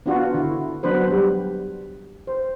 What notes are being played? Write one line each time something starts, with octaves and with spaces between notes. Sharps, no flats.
B3 D4 F4 F#4
D3 E4
F#3 B3 D4 B4 C5
G3
C5